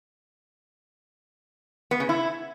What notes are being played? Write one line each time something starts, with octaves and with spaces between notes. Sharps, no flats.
B3
C#3
E4